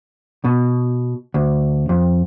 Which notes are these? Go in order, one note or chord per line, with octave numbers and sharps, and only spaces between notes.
B2
D2
F2